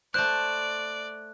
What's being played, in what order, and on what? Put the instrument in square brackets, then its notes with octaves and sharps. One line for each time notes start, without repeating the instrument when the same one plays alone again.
[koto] A3 C5 [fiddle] D5 [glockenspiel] F#6